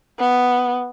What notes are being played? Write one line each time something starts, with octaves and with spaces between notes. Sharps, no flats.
B3